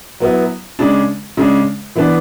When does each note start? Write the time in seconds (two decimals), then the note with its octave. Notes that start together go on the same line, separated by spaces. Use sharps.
0.20 F#3 B3 E4
0.79 C#3 G#3 D4
1.37 C#3 G#3 D4
1.95 E3 B3 D4